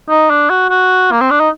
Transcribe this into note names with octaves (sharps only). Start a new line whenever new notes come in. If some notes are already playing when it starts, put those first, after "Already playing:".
D#4
D4
F#4
F#4
A#3
C4
D4
D#4